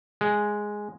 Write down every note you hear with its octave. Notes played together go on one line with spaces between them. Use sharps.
G#3